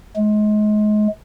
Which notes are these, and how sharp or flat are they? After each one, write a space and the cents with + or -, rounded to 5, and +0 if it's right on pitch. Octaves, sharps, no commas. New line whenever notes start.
G#3 +30